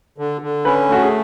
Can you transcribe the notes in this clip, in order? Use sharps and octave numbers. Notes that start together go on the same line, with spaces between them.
D3
D3
C#4 B4
A3 F#4
G#4